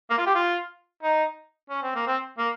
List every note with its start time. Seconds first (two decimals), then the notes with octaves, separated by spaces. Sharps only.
0.10 A#3
0.18 F4
0.26 G4
0.35 F4
1.03 D#4
1.70 C#4
1.83 C4
1.95 A#3
2.07 C4
2.38 A#3